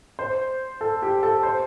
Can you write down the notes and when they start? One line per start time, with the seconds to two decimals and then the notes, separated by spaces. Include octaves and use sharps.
0.19 C5
0.81 A4
1.02 G4
1.23 A4
1.43 C5